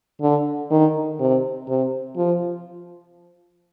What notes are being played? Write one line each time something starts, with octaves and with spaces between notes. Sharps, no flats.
D3
D#3
C3
C3
F3